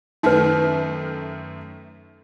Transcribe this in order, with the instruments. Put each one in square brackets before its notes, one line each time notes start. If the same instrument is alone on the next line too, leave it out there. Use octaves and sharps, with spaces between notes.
[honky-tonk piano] F#2 D#3 A3 [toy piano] D#4 B4